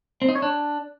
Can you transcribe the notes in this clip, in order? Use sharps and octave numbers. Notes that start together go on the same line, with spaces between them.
C4
D#4
C#5
D4